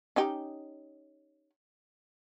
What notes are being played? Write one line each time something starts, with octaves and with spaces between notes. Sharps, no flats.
C#4 D#4 G4